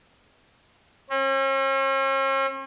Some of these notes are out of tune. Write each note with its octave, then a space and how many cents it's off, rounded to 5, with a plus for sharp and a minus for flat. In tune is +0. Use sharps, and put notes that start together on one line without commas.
C#4 -45